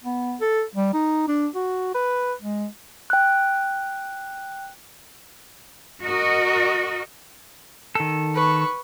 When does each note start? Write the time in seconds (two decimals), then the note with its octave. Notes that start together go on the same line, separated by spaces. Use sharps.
0.04 B3
0.41 A4
0.76 G3
0.93 D#4
1.28 D4
1.55 F#4
1.95 B4
2.42 G#3
3.10 G5 F#6
6.01 F#4 A#4 D#5
7.95 D#3 A4
8.35 B4 C#6